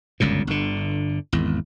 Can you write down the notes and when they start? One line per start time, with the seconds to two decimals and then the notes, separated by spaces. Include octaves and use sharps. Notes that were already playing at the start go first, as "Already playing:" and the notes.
0.20 G1 C#2 F#2 A#2
0.47 G1 D3
1.33 G#1 E2